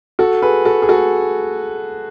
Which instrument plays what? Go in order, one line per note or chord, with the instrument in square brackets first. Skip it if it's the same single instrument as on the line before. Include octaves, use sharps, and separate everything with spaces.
[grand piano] F#4 A4
G#4 B4
F#4 A4
G#4
F#4 A4